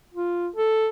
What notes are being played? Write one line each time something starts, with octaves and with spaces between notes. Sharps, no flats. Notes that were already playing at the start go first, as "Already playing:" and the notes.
F4
A4